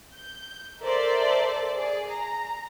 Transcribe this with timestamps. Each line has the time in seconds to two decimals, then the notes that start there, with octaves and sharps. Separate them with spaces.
0.15 G6
0.81 A4 A#4 C5 D5 E5
1.76 G#4 D5
2.10 A#5